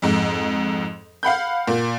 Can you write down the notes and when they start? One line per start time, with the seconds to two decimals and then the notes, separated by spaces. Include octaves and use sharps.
0.02 F2 G#2
1.23 F5 F#5 B5 G6
1.67 A#2